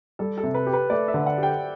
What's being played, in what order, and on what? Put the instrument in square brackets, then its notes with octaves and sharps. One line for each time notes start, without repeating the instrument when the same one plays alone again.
[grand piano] G3 [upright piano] A4
[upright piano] A4
[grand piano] C3
[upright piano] B4
[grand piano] G4
[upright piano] B4
[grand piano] A3 [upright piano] D5
[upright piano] E5
[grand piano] D3
[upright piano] F#5
[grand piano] G4 [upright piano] G5